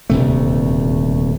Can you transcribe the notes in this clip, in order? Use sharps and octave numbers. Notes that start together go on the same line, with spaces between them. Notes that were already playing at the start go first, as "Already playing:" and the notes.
D#1 D2 C3 A3